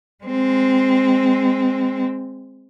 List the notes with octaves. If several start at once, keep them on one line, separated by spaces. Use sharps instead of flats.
G#3 C4